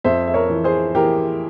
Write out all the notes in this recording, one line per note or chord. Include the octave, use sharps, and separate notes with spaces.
F2 C5 E5
E5
A#4 C#5
E3
G#4 C5
E3 G4 A#4